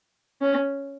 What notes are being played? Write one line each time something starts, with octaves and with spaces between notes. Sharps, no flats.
C#4